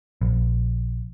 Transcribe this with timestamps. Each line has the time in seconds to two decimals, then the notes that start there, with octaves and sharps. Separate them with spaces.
0.21 A#1